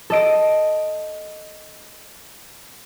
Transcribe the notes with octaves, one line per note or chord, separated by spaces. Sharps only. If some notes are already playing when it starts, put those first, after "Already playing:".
A4 D#5 D7